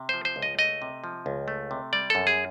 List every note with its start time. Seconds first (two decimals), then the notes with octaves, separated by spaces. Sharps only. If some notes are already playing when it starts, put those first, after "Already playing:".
Already playing: C3
0.09 F3 C5
0.25 C5
0.36 C#2
0.42 D#5
0.58 A3 D#5
0.82 C3
1.04 F3
1.26 C#2
1.48 A3
1.71 C3
1.93 G3 D5
2.10 F#2 A4
2.27 G#4